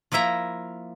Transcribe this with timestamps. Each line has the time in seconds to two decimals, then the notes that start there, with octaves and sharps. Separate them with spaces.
0.12 F3 A#3 E4 E5 A#5